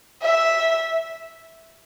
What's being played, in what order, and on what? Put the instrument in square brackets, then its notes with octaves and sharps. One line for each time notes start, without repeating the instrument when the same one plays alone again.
[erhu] E5